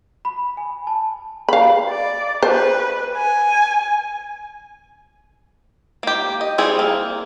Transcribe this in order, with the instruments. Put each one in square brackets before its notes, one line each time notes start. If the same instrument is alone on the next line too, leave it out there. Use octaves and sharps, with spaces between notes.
[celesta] B5
G#5
A5
[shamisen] F5 B5
[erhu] D5
[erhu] B4 [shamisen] C5
[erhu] G#5
[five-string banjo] A#3 G4
D#5
E3 G3 C4 E4 G#4
A#3